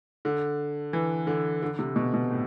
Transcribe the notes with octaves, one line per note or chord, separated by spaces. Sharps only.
D3
E3
D3
D3
C3
B2
B2
A2